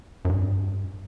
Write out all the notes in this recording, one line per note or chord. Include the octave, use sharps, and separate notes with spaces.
F#2
G2